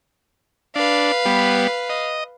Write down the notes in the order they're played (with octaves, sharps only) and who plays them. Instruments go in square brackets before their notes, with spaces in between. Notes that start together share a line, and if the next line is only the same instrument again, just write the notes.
[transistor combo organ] D4 [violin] B4 F5
[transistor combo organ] G3 B3
D#5